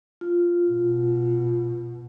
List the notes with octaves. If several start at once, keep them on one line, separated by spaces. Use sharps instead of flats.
F4
B2